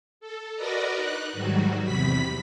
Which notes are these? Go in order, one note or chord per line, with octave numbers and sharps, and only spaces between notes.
A4
F#4 A#4 B4 D5 D#5 A#5
D#4 F#6
G#2 D#3 F#3 G3 F#4
E2 C3 B5 B6